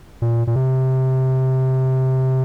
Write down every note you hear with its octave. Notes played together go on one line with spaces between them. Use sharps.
A#2
A#2
C3